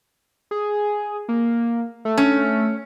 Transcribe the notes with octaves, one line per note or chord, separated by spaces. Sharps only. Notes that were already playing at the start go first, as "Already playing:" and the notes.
G#4
A#3
A3
C#4